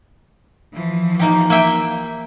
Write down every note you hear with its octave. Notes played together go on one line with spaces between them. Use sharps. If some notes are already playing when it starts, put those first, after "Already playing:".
E3 F3
A#3 D#4 G4
A#3 E5 G5